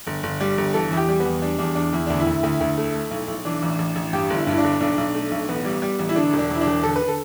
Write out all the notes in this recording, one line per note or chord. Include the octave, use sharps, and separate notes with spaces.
G1
G1
G3
G1
E3 A4
E2 E4
G4
G3
E2 B3
G3 D4
E2 D4
E2 D4
E2 E4
D2 D4
E4
D2
D2
D2
A3
A3
B1
B1
E3 D4
A1
A1
A1
G2 G4
G1 E4
G2 E4
D4
G1
B1 D4
B1
A3
B1
A1 B3
G3
G3
A1
E4
D3 D4
E1
D4
E1
E4
D4
E1
D3 A4
B4
D3
A4